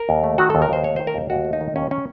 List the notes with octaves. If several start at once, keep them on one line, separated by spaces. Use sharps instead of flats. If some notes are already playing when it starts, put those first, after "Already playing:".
Already playing: A#4
D#2
A3
D#3 F#4
D#2 A4
A#4
D#2 C5
A3 C#5
D#3 C5
A#4
D#2
D#2 F#4
A3
D#4
D#3
D#2 C#4
C#4